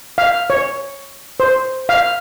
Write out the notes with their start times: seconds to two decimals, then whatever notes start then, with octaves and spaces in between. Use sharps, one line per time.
0.18 F5
0.50 C#5
1.40 C5
1.89 F5